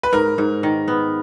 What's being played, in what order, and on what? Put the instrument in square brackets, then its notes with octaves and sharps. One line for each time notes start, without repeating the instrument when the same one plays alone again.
[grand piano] B4
[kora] G#2 [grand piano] A#4
[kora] G#2
D#3
B3